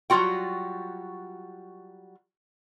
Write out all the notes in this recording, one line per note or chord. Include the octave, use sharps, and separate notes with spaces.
F#3 G3 F4 F#4 G5